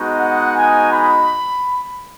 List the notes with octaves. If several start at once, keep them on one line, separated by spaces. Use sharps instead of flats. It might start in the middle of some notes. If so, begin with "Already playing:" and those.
Already playing: G#3 B3 D#4 F#4
F#5
G#5
B5